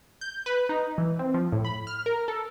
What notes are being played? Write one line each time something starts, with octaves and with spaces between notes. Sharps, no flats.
G6
B4
D#4
E3
C4
F3
A2
B5
F6
A#4
A4